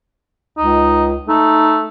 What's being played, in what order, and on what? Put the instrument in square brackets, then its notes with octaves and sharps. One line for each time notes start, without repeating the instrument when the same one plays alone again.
[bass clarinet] C#2 [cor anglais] D#4
[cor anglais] A3 [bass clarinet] D#4